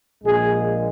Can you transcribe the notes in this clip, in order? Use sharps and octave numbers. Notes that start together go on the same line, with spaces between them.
A#1 A#2 G#3 G#4